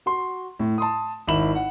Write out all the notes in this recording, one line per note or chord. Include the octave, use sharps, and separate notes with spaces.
F#4 C6
A2
A5 C6 D#6
G#1 E4 B5 E7 F#7
F#5